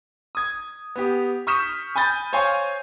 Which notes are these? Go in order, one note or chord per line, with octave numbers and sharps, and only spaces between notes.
D#6 G#6
B3 G4
C#6 D#6 F6 G6 B6 E7
G#5 B5 G6 A6
C5 C#5 F5 G#5